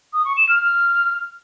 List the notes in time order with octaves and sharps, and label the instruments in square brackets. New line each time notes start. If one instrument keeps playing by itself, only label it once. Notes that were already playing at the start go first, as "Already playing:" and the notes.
[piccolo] D#6
C#6
E7
F6
F6